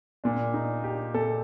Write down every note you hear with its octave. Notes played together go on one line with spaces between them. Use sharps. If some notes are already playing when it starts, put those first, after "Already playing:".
A#2 D4
D#4
G4
A#2 A4